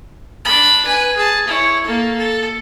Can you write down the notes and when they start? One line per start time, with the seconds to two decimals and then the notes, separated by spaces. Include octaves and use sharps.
0.44 D4 B5
0.85 B4 G#5
1.16 G#4 A5
1.47 E4 C#5
1.84 A#3 A4
2.18 A4